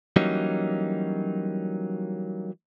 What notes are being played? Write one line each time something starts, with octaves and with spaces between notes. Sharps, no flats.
E3 F#3 G3 A#3 C#4 D#4